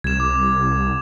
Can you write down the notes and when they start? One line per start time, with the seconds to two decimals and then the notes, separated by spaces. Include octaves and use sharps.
0.04 C2 G#6 E7
0.20 D6